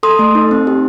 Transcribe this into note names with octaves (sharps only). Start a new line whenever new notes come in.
A4 C6 D#6
A3
D#4
C4
G4